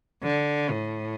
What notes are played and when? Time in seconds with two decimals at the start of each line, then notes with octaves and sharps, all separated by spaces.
0.23 D3
0.71 A2